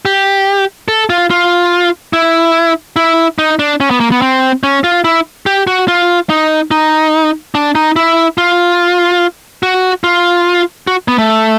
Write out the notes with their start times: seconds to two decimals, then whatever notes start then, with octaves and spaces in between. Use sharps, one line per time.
0.05 G4
0.88 A4
1.10 F4
1.30 F4
2.13 E4
2.96 E4
3.39 D#4
3.59 D4
3.80 C#4
3.91 B3
4.00 A#3
4.12 B3
4.22 C4
4.63 C#4
4.84 F4
5.04 E4
5.46 G4
5.67 F#4
5.88 F4
6.30 D#4
6.71 D#4
7.55 D4
7.75 D#4
7.96 E4
8.38 F4
9.63 F#4
10.04 F4
10.87 F#4
11.08 B3
11.18 A3